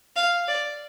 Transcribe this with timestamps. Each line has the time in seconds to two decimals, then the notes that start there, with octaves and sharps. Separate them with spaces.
0.16 F5
0.48 D5